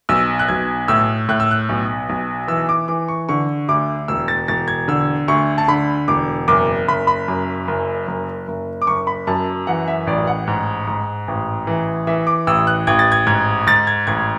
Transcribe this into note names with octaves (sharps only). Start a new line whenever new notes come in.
B1 E6
F#6
B1 G#6
A2 E6
A2 F#6
E6
F#6
B1
B1
E3 E6
D6
E3 D6
C#6
D3 C#6
D2 D6
E1 E6
A6
E1 A6
G#6
D3 E6
D2 C#6
A5
D3 B5
E1 D6
F#1 D6
F#1 B5
B5
F#2
F#1
F#1
F#1
D6
F#1 C#6
B5
F#2 A5
E3 F#5
E5
A1 D5
F#5
G#2
G#2
A1
E3
E3 E5
D6
A1 E6
F#6
A1 G#6
A6
G#6
G#2 G#6
G#2 A6
G#6
A1 G#6